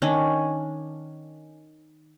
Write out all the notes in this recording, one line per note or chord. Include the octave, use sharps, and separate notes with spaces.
D#3 C#4 D4